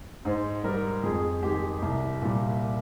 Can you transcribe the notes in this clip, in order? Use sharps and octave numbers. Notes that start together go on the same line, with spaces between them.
G#2 C5
G3 A#4
F2 G#4
D#3 G#3 G4
C2
A#2 G3